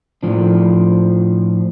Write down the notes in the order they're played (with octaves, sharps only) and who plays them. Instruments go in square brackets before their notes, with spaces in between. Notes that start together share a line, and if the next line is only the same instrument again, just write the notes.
[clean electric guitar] A2 F3 D4